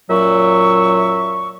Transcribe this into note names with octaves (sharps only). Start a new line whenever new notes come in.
F#2 A#2 F#3 E5 C#6